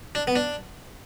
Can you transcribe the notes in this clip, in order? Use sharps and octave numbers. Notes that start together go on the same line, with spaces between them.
D4
B3
D4